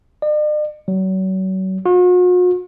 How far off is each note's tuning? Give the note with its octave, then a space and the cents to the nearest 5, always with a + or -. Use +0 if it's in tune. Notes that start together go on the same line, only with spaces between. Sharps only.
D5 +45
F#3 +35
F#4 -45